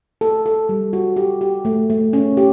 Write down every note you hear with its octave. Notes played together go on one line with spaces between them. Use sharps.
A4
A4
G3
F#4
G4
G4
A3
A3
C#4
G4